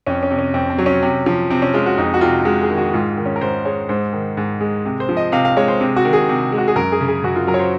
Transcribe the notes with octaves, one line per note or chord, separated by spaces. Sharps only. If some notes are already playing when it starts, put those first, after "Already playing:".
F2 C#4
C#4
C3
C#4
F2 C4
C4
F#3
C#4
C3
F3
C3 C4
C#4
G#3 F4
F#4
F2 D#4
F#4
C3 F4
G#3 F#4
G#4
D#3
F#4
G#2 F4
D#3
C#4
A#4
G#2 C5
G#3 C#5
G#2 C5
D#3
G#2
G#3
C3
C5
F3
D#5
C3 F5
F5
G#3 C#5
C5
C3
F#4
D#3
G#4
C3
G#3
F#4
G#4
F#2 A#4
G#4
C#3
G#4
F#2 F#4
F4
F#3 A#4
C#5
C5